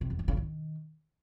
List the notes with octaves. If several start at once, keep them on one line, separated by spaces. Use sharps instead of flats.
C3
E2
D#3
C#3
D#3